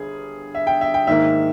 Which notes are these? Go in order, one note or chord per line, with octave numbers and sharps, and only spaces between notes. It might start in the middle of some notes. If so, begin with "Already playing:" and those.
Already playing: G1 G2 G#4
E5
G5
E5
G5
G#2 D#3 A#3 E5